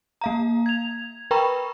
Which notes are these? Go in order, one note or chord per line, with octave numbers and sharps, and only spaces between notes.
A#3 F5 A#5
G#6 F7
A#4 B4 G5 A#5 B5 C#6